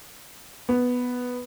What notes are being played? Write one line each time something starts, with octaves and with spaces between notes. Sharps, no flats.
B3